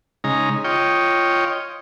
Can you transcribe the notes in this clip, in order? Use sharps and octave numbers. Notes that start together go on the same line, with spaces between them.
C#3 G#3 D#4 A#5
F4 C#5 D#5 G5